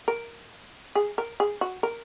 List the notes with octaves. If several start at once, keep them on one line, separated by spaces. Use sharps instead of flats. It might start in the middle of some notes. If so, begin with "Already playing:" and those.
A#4
G#4
A#4
G#4
F#4
A#4